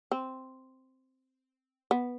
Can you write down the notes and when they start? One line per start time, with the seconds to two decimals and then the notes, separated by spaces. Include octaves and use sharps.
0.12 C4
1.91 B3